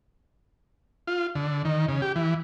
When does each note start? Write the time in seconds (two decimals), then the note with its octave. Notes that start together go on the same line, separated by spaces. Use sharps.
1.07 F4
1.35 D3
1.65 D#3
1.88 C#3
2.02 G4
2.16 E3